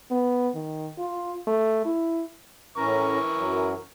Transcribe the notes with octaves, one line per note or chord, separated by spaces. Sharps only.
B3
D#3
F4
A3
E4
A2 E3 C#4 A#4 A#5 C#6
F#2 F#3